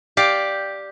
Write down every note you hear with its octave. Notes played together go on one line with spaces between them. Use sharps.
G4 D5 F5